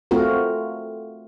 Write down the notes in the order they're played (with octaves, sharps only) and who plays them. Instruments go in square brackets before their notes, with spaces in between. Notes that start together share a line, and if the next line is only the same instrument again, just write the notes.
[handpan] A3 C4 F4 F#4 A#4